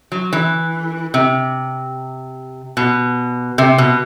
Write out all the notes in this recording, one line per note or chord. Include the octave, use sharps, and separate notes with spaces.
F#3
E3
C3
B2
C3
B2